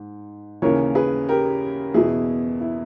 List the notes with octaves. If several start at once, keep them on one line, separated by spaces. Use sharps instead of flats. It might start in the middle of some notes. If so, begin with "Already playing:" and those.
Already playing: G#2
D#2 C#3 E3 A#4 C#5
G#4 B4
G4 A#4
E2 B2 E4 G#4
E4